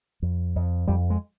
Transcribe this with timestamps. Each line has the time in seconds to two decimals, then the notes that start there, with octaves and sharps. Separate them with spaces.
0.22 F2
0.56 F2
0.88 F2 G3
1.10 G#3